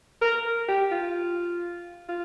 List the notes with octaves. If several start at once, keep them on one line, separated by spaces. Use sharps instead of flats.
A#4
G4
F4
F4